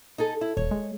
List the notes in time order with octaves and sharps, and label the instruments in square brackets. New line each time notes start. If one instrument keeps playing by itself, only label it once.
[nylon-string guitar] D#4 G#4 A4
E4
[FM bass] D#1 [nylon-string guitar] C#5
[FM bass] G#3